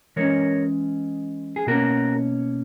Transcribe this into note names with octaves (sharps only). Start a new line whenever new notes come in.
E3 G#3 C#4 A#4 C#5
G#4
B2 A#3 C#4 F#4 A#4